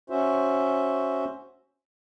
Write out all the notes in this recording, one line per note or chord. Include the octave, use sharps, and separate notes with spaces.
C#4 F#4 C5 E5